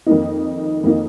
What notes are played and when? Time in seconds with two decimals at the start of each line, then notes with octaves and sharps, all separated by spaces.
0.06 F2 D#3 A#3 D#4
0.83 F2 D#3 A#3 D#4